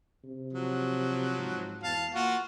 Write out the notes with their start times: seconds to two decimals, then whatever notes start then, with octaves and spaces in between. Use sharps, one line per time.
0.24 C3
0.53 F3 F#3
1.38 G#2
1.83 E2 F5 A5
2.15 A#3 F4 F#4